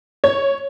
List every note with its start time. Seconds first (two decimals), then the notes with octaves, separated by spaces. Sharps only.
0.24 C#5